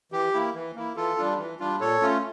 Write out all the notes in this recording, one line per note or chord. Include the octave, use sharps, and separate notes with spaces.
E3 G4
A#3 E4
E3
A#3 E4
E3 F4 A4
G3 D4 F4
E3
G3 D4 F4
A#2 A4 C#5
A3 C#4 F4